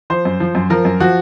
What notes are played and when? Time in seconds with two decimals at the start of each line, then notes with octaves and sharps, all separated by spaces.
0.10 F3 C5
0.25 F#2
0.40 F3
0.55 F#2
0.70 F3 A#4
0.85 F#2
1.00 F3 F#4